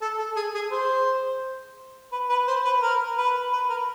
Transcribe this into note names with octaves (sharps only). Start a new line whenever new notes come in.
A4
A4
G#4
G#4
C5
B4
B4
C5
B4
A#4
B4
B4
A#4